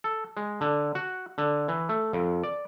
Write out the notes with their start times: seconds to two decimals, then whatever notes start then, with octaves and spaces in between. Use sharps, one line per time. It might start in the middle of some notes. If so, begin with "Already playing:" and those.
0.04 A4
0.37 G#3
0.61 D3
0.95 F#4
1.38 D3
1.68 E3
1.89 A3
2.13 F2
2.43 D5